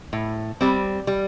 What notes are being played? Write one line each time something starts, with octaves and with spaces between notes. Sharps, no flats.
A2
G3 C4
G3